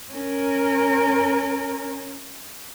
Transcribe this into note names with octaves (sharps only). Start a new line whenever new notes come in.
C#4 A#4